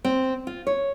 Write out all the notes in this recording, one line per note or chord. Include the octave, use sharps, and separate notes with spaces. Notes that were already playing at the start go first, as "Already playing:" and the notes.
C4
F4
C#5